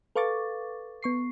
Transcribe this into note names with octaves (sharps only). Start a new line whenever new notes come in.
A4 B4 F5 C#6 D6 A6
B3 C#6 C7